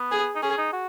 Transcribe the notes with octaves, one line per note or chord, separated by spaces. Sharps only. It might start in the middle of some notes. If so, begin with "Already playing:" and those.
Already playing: B3
G#4
D#4
C#4 G#4
D#4
F#4